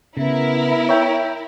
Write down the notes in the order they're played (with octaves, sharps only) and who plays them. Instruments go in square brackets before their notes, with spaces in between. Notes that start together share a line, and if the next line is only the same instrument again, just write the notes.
[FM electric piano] C#3 [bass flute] B3 [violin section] E4 A#4
[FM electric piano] C#5 E5 G5